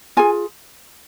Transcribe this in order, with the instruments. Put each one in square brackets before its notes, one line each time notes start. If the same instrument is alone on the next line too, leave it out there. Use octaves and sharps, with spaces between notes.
[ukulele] F4 G#4 G#5